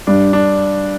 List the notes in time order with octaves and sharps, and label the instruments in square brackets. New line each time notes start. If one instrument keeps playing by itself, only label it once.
[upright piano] G2 [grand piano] D4
[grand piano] D4